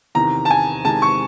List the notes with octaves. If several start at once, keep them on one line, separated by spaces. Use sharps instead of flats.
E2 C3 D#3 A#5
A5
G#5
E2 C3 D#3 G#3 C4 A5
C#6